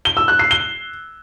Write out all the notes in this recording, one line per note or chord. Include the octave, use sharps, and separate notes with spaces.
G7
E6
F#6
C7
G7